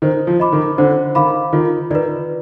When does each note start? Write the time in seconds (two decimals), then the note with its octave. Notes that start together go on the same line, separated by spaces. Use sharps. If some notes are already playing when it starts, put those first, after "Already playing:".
0.02 D#3 C5
0.27 F3
0.40 D#5 B5 D6
0.52 D#3
0.78 D3 C5
1.15 D#3 F5 B5 D6
1.53 D#3 F4
1.90 D#3 B4 D5